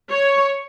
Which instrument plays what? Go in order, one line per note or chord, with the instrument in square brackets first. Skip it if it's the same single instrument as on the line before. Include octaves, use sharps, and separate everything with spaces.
[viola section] C#5